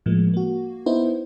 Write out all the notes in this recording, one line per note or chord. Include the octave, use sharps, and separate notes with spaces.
A2 F3 G#3 A#3
A#3 F#4
B3 D#4 E4 C5